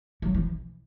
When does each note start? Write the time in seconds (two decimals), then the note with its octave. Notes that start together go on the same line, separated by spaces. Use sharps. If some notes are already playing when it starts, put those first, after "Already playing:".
0.22 F#3
0.34 E3